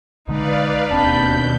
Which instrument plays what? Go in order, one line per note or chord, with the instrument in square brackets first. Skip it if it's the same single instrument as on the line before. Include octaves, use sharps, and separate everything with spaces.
[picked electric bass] B1 D3 G#3 [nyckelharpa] D#4 [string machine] B4 D5 F5
[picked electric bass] D1 C4 [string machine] D#2 B2 G6 [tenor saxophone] D4 [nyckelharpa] B5